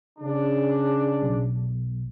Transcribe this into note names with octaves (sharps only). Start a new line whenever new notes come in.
C#3 D4
B1